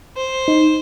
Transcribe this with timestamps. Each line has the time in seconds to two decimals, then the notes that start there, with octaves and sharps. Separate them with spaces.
0.17 C5
0.48 D#4